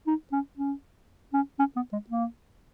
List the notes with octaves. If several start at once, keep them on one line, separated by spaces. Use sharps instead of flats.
D#4
C#4
C#4
C#4
C#4
B3
G#3
A#3